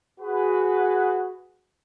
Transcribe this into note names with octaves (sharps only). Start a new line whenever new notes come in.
F#4 G#4 B4